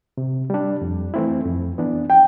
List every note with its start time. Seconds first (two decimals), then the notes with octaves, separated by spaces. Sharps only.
0.17 C3
0.50 G3 D4
0.82 F2
1.14 E3 A3 C4 E4
1.45 F2
1.78 E3 B3 D4
2.10 G5